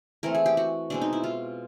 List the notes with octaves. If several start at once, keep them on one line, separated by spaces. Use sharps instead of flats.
E3 A3 C4 A#4
G#4
G4
F#4
B2 G#3 C4 D4
D#4
E4
F4